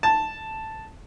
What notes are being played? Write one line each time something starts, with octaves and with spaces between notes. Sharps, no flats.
A5